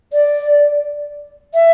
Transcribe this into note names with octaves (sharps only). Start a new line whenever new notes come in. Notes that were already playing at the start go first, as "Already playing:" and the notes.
D5
E5